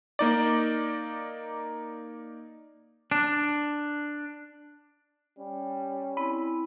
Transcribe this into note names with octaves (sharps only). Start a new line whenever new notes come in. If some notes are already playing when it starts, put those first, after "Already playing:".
A#3 D#4 D5
D4
G3 C#4
C4 E4 B5